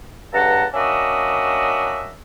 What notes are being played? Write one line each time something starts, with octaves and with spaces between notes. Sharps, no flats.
C#2 G2 A4 F#5 A5 A#5
A#3 C#4 D4 F#4 D#5 E5